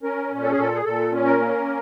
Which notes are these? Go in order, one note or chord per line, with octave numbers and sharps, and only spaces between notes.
C#4 A#4
A#2
A4
G#4
A#2 A4
G#4
A#2 A4
C#4
A#4
A#3